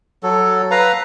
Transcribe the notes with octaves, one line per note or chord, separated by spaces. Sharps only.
F#3 A4
B4 F5 A#5